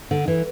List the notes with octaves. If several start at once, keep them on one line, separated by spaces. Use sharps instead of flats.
D3
E3